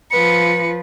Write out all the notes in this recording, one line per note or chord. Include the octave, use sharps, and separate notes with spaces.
F3 B4 C#7